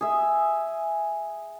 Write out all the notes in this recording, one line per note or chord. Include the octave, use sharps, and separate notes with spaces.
G#4 E5